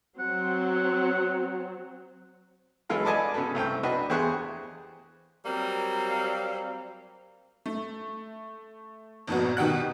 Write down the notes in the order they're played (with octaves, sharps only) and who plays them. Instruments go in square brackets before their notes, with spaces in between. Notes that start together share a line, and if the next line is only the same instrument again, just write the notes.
[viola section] F#3 C4 [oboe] F#5
[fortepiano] E3 F#3 G#3 F4 A4
A4 B4 D5 D#5 G#5 A5
C#3 B3 F#4 A4
C2 A3 C4 G5
D4 F#4 B4 D#5
E2 G4 G#4 C5 C#6 F#6
[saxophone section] F#3 G3 A#3 C4 F5
[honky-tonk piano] A3
G1 F2 A#2 B3 F#4
B2 D#3 G4 F#5 F#6